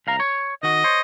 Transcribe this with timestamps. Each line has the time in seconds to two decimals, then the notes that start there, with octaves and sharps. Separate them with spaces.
0.07 C2 F5 A#5
0.20 C#5
0.63 D#3 F#4 D#5
0.84 C5 C#5